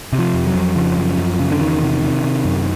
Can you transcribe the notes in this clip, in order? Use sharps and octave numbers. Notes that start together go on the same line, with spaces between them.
C3
F3
F2
F#3
F2
C#3 F3
F#2
F#2
C#3
D3
E2 D#3
C3
C3
C3
F#2